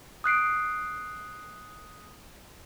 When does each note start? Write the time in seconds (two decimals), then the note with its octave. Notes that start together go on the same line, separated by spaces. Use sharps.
0.24 D#6 F#6 C7 D7